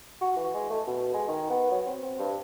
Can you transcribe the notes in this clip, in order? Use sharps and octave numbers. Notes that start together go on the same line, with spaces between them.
F#4
E3
G#3
A3
B2
G#3
D#3
B3
F#3
C4
C4
G2